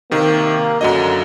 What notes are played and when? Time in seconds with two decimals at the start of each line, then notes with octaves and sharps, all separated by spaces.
0.11 C3 D#3 A#3
0.81 F#2 D3 F#3 D#5